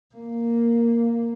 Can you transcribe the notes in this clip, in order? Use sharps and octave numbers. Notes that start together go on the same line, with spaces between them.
A#3